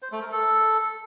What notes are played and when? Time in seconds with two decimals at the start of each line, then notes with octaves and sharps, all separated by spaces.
0.02 C5
0.12 A3
0.22 A#4
0.32 A4